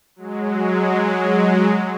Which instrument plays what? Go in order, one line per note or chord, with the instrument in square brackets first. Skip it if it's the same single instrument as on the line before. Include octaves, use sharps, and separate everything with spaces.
[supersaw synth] F#3 G#3